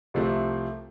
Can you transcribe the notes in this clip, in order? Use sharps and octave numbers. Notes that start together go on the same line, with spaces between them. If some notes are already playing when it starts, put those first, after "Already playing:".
C2 C3 F3 A3 C4